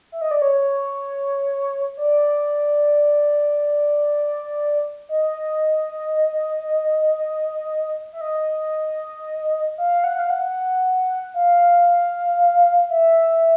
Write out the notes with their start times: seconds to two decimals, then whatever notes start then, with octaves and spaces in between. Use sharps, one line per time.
0.12 E5
0.21 D#5
0.31 D5
0.42 C#5
1.97 D5
5.09 D#5
8.13 E5
8.21 D#5
9.78 F5
10.04 F#5
10.19 F5
10.30 F#5
11.34 F5
12.90 E5